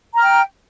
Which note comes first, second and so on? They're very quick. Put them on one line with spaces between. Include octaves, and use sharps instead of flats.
A#5 F6 G5